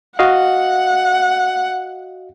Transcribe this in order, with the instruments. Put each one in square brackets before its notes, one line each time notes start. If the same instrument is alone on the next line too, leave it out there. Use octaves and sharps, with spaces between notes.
[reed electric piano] F#4 D#5 F5 [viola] F#5